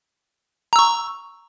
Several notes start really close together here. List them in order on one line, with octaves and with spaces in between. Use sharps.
A#5 E6 C#6